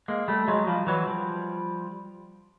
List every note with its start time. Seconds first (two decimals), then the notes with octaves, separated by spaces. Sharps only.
0.08 G#3 A#3
0.28 G3 A3
0.48 F#3 G#3
0.67 F3 G3
0.87 E3 F#3
1.07 F3 G3